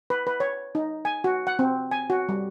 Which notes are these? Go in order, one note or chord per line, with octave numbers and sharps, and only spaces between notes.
B4
B4
C#5
D#4
G#5
F#4
F#5
C4
G#5
F#4
G3